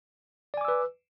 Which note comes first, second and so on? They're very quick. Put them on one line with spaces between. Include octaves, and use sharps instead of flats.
D5 G#5 D6 E6 B4